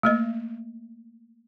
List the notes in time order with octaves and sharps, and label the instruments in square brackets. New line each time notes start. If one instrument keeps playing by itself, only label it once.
[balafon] A3 A#3 D#5